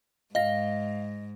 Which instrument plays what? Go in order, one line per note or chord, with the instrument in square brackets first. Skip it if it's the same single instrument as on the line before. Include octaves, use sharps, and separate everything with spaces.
[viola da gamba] G#2 [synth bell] D#5 A#6 [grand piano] F5